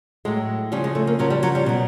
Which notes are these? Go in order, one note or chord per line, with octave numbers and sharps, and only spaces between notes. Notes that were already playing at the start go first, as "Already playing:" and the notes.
A2 F#3 G#3
C#3 F3 G3
G#3
A3
A#3
C#3 F3 F#3
G3
F#3
G3
B2 F#3